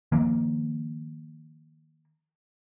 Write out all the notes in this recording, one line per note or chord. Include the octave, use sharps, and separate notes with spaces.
D#3 F3 A#3